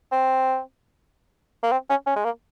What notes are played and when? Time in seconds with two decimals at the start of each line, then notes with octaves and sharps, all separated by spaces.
0.12 C4
1.63 A#3
1.72 C4
1.89 C#4
2.06 C#4
2.16 G#3
2.24 A#3